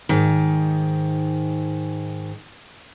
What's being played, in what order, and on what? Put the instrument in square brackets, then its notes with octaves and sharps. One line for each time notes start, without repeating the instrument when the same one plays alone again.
[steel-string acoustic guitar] G#2 D#3